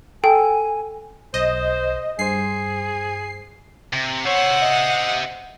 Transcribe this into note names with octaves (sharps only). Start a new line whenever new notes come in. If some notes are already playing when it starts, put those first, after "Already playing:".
A4 G5 G#5
B1 C5 D#5
G2 G#4 C5 C7
C3
C5 C#5 E5 F#5
D#5